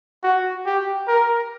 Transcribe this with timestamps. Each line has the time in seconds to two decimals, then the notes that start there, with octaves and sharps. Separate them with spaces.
0.23 F#4
0.66 G4
1.08 A#4